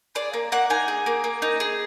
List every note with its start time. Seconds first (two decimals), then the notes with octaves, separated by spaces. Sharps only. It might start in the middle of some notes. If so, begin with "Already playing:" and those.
0.15 G#4 D5
0.33 A#3
0.52 A#3 F#5
0.70 D#4 G#5
0.88 G#4
1.06 A#3
1.24 A#3
1.42 D#4
1.60 G#4